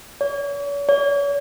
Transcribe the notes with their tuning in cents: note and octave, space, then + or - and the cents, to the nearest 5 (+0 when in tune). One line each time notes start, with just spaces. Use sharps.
C#5 +40
C#5 +40